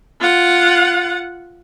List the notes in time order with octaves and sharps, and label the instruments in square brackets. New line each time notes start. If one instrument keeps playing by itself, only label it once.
[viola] F4 F#5